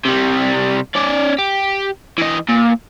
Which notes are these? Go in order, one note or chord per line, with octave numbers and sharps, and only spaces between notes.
C3 G3
C#4 D5
G4
E3 D#5
A#2